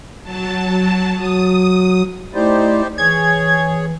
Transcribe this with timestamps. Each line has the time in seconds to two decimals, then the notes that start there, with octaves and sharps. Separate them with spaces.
0.23 F#3 A5
1.16 F#3 D#6
2.34 A3 D#4 E4 G4 C5 D5
2.98 E3 G#4 C#5 G#6